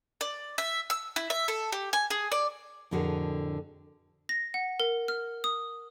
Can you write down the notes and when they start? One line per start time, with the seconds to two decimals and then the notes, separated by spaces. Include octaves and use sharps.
0.21 D5
0.58 E5
0.90 E6
1.16 E4
1.30 E5
1.48 A4
1.72 G4
1.93 G#5
2.10 G#4
2.32 D5
2.91 F2 A2 D3 F#4 G#4 A#4
4.29 A#6
4.54 F#5
4.80 A#4
5.08 F6
5.44 D#6